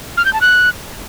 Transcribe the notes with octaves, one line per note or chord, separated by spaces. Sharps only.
F6
G6
A5
F#6